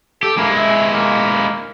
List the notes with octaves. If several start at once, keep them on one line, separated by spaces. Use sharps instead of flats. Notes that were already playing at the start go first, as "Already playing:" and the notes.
G4 A4
G#3 A#3 E4
E5
A#3